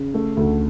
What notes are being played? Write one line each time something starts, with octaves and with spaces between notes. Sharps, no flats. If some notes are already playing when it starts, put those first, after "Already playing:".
Already playing: C#3
A3
D2